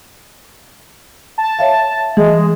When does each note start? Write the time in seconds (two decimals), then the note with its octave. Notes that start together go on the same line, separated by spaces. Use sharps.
1.38 A5
1.59 C#5 E5 F5
2.17 E3 G#3